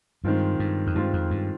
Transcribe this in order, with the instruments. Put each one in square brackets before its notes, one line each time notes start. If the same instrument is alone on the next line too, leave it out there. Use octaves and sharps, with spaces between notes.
[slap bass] G2 [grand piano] D#3 G#3 C4 F4
[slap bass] G2
F2
[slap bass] G2 [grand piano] D#3 G#3 C4 F4
[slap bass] F2
G2